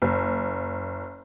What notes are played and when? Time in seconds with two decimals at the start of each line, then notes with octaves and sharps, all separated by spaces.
0.02 F#1